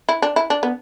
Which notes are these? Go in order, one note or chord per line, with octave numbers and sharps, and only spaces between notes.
E4
D4
E4
D4
B3